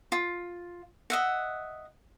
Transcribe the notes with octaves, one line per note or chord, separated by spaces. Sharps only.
F4
D#5 E5 F#5